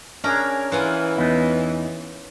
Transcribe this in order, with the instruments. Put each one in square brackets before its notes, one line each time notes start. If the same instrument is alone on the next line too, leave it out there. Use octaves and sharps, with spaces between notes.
[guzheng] C#4 A#4 [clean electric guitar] D4 G#4
[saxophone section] E3 [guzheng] F4 F#5 G#5
[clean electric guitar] E2 B3 D#4